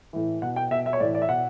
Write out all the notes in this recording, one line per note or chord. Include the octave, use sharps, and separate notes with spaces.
A2 E3
B2 F#5
G5
B2 E5
E5
C#5
A2 E3 D5
D5
E5
B2 F#5